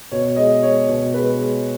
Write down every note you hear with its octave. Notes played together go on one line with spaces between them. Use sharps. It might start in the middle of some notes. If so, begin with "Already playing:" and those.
B2 C#5
G#3 D#5
G#3 C#5
B2
G#3 B4
G#3